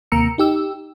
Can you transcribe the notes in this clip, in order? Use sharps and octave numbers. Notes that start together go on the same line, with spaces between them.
D#2 C3 A#3 A#5 E6 C#7
D#4 G4 E6